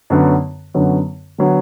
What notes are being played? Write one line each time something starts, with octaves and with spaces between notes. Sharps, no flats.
F#2 D3 F#3 B3
F#2 D3 F#3 B3
D3 F#3 B3